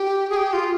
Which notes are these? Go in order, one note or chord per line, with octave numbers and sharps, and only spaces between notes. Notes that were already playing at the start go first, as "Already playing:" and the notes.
Already playing: G4
G#4
G4
F4